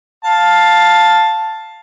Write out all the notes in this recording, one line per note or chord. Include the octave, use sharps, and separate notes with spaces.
F5 A5